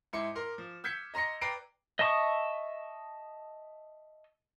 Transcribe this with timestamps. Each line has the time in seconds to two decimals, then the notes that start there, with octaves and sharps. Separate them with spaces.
0.13 G#2 E4 C6 D6 C#7
0.35 A#4 C6 F6
0.58 F3
0.84 E6 G6 G#6 B6 C#7
1.14 D#5 A#5 C6 A#6 C#7
1.41 B4 D5 G5 A#5 C7 D7
1.99 D#5 E5 A5 C#6 D#6